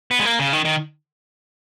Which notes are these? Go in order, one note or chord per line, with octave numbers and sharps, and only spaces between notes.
B3
G#3
A#3
C#3
D#3
D#3